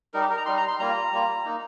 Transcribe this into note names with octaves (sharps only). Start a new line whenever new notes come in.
G3 D#4 A#4
G4
A#4
A#5
G3 D#4 C6
A#5
C6
G3 A#3 F4 A#5
G3 A#3 F4
A#3 D#4